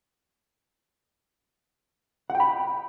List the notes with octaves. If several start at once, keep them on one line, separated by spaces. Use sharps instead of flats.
F#5
G5
B5